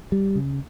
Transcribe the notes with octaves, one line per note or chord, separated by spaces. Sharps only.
G3
C#3